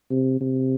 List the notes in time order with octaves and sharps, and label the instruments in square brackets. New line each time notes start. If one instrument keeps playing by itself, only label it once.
[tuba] C3
C3